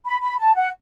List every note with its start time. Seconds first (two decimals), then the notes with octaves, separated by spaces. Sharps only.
0.05 B5
0.21 B5
0.38 A5
0.55 F#5